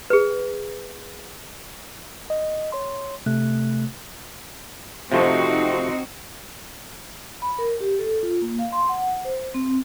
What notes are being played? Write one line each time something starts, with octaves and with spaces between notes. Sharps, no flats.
G#4 B4
D#5
C#5 C6
C3 A3 F#6
C3 F3 A3 C4 D#4 F#4
B5
A#4
G4
A4
F4
A#3
F5
C6
F#5
C5
C4